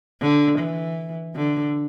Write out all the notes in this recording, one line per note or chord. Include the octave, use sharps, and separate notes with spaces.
D3
E3
D3